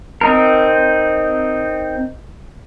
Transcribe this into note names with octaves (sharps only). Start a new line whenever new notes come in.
C4 D#4 A#4